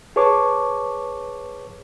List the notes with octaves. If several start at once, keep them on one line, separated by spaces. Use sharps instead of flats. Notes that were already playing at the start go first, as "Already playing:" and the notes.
G#4 B4 C#5 A5 C#6 D6